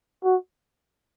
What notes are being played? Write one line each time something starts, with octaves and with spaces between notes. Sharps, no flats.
F#4